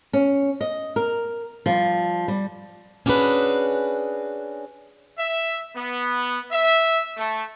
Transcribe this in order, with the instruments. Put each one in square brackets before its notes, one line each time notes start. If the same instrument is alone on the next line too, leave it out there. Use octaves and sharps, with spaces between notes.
[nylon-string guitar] C#4
D#5
A#4
F3 G3
G3
[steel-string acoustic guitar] C#4 D4 F#4 G#4 B4
[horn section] E5
B3
E5
A3